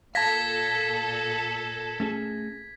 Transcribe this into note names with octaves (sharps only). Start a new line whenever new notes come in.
A#2 A4 F5 A5 G#6 A#6 B6
A3 C#4 G#4